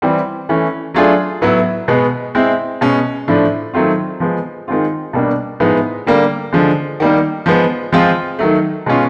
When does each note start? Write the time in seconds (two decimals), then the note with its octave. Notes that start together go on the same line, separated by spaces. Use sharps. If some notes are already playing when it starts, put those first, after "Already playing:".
0.02 E3 G3 C4
0.49 E3 A3 C#4
0.94 F#3 A3 D4 F4 G#4
1.41 A2 F#3 B3 E4
1.88 B2 G#3 B3
2.35 G#3 C4 E4
2.81 B2 G#3 C#4
3.28 A2 F3 A3 D4
3.74 D#3 F#3 A3 C4 F4
4.20 F3 G#3 B3
4.68 D#3 G#3 C4 F4
5.13 B2 G3 A#3 D4
5.60 A2 F3 G#3 B3 D#4
6.06 D3 G3 A#3
6.53 D3 F3 G#3
7.00 D#3 G3 A#3
7.46 F3 G#3 B3
7.92 F3 G#3 C4 F4
8.39 D#3 F#3 A3
8.86 B2 G#3 C#4 F4